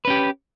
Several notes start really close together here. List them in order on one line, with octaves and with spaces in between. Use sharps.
B4 C#4 G4